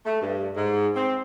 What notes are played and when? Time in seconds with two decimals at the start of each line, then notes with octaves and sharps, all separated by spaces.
0.06 A3
0.22 G2
0.56 G#2
0.96 C4